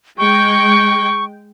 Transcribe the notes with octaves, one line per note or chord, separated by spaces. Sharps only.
G#3 G5 C#6